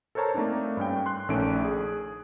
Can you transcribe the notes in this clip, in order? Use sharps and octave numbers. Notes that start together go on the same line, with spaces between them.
A4 A#4 C5 C#5 A5 A#5
A3 A#3 C4 D4 D#4
G2 C#4 G5
C6 F#6
A#1 D#3 A3 C#4 D4 D7
G#4